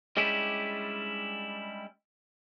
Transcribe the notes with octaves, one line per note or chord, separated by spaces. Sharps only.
G3 G#3 C#4 D4 E4 G4